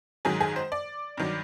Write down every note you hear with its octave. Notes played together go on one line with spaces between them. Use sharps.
G#2 D#3 F#3 G#4
G#4
C5
D5
G2 D#3 F#3